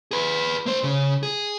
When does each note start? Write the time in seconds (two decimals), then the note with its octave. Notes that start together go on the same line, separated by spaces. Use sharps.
0.11 G#4 B4
0.66 A#3 C5
0.83 C#3
1.23 G#4